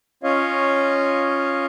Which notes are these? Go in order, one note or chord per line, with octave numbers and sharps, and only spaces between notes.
C#4 F4 C#5 D#5 F5